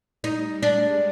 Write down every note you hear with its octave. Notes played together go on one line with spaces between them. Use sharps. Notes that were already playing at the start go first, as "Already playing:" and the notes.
G3 D#4
G#3 D4